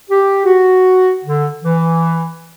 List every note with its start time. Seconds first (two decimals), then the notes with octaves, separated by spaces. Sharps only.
0.10 G4
0.45 F#4
1.25 D3
1.65 E3